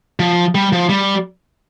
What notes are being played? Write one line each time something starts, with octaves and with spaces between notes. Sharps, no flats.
F3
G3
F3
G3